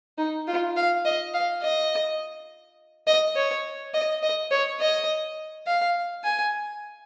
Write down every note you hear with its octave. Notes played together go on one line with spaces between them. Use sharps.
D#4
F4
F5
D#5
F5
D#5
D#5
C#5
D#5
D#5
C#5
D#5
F5
G#5